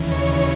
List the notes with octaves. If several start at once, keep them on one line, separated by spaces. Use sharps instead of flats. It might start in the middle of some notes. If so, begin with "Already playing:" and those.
Already playing: D#2 C#3 E3
C#5
C#5